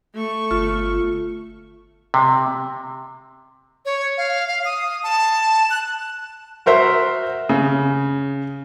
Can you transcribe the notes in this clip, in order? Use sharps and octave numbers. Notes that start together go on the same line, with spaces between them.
A3 C#6
G1 F4
C3
C#5
F5
F5
D#6
A5
F#6
F#4 A#4 C5 E5
C#3